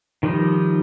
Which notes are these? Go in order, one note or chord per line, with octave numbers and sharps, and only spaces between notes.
D#3 F3 G3 D#4